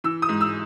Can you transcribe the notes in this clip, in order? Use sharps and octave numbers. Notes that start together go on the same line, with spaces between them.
E3 E6
D#6
G#2
E6